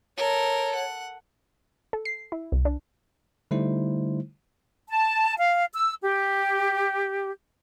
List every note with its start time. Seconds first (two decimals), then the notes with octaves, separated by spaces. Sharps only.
0.17 A4 A#4 C#5
0.75 F#5
1.93 A4
2.05 C7
2.32 E4
2.52 C2
2.65 D4
3.51 D3 G3 A3 D#4 E4 C5
4.89 A5
5.38 F5
5.73 E6
6.02 G4